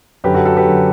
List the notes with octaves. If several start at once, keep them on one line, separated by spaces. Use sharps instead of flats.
F#2 D3 G4 B4
F#4 A4
F#4 A4
G4 B4
F#2 D3